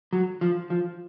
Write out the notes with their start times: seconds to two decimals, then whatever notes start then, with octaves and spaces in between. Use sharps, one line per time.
0.13 F#3
0.41 F3
0.70 F3